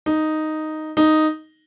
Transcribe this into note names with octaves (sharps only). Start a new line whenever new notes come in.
D#4
D#4